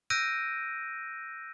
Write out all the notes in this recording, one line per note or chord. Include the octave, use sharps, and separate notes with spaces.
E6 F#6 G6 A#6 D7 D#7